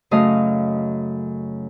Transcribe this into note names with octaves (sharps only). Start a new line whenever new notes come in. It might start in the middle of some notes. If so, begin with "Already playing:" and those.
F#2 C#3 A3 D#5 F5